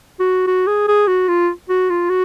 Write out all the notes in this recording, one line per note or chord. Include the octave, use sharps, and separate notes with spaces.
F#4
F#4
G#4
G#4
F#4
F4
F#4
F4
F#4